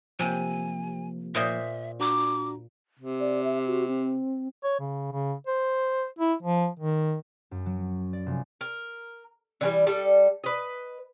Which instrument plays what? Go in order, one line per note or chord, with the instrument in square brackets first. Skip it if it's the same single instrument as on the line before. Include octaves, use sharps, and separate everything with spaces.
[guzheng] C3 [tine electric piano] F3 A#3 [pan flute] G#5
[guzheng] A#2 C5 D#5 [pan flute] E5
[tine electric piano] D4 F#4 A#5 [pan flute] D6
[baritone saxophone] C3
[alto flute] D5
E5
F#4
C4
[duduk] C#5
C#3
C#3
C5
E4
F3
D#3
[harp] F#2
F#3
D5
F1
[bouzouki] A#4
D3 E3 G3
G3 A4
B4 D#5